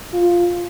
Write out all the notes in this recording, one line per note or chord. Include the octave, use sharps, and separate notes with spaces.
F4